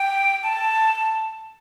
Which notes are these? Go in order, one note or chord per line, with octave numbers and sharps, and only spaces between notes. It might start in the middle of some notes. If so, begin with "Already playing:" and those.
Already playing: G5
A5